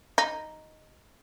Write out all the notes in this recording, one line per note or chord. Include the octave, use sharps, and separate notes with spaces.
D#4